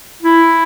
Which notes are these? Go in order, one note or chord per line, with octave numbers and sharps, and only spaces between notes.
E4